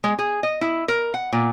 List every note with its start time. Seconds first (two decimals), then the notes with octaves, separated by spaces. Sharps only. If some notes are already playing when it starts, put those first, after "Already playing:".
0.04 G#3
0.19 G#4
0.43 D#5
0.61 E4
0.88 A#4
1.14 F#5
1.33 A#2